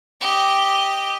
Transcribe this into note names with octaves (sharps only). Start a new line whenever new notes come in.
G4 D#5